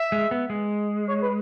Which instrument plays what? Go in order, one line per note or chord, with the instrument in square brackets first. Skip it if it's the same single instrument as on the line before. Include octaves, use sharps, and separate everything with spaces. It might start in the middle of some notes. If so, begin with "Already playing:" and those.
Already playing: [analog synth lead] E5
[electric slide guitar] G#3
B3
G#3
[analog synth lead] C#5
B4